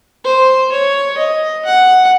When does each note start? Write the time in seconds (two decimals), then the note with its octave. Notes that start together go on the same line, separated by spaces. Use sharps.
0.24 C5
0.72 C#5
1.17 D#5
1.65 F#5